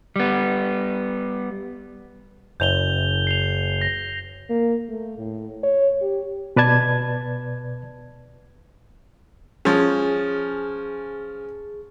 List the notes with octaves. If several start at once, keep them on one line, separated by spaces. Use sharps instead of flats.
G3 B3
F#1 G6 F7 G7
C7 F7
A#6
A#3
A3
A2
C#5
G4
B2 B4 D5 A5 G#6
F3 C#4 G#4